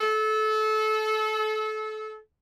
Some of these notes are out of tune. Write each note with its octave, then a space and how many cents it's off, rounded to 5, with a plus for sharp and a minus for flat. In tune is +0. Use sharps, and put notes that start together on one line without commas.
A4 -25